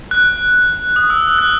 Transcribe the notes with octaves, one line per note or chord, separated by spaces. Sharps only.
F#6
D#6
E6
E6
F#6